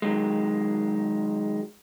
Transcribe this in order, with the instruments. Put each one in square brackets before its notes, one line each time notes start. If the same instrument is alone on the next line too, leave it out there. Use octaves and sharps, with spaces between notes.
[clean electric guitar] D#3 F#3 G#3